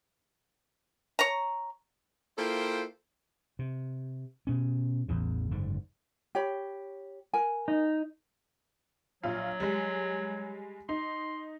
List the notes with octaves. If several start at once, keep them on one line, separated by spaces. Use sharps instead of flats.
C#5 A#5
A#3 E4 F4 A4 C5 G5
C3
B2 C#4
A1 E2 C#3
F#1 G#2 D3
G4 C#5 B5
A#4 G#5
D#4
A#1 F#3 F4
G3 G#3
D#4 C6